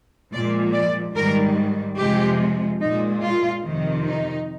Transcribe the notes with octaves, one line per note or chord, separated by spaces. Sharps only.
A#2 F3 G#3 D5
D5
G#2 D#3 G3 A#4
F2 C3 F3 G#3 G4
A#2 G#3 D#4
F4
F2 C3 D#3
D#4